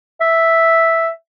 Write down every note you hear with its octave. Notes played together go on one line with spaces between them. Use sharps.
E5